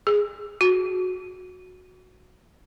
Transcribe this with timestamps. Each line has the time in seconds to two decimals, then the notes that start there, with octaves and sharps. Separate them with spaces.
0.07 G#4
0.61 F#4